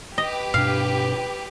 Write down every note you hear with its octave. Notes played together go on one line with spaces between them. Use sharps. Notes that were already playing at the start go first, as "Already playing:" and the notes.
G4 B4 D#5
G2 B2 D4 F5